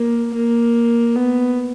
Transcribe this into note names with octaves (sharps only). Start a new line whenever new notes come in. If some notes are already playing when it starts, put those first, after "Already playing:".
Already playing: A#3
A#3
B3